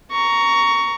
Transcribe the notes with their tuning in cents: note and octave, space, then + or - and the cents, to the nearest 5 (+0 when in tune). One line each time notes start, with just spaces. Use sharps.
A#5 +0 C#6 +15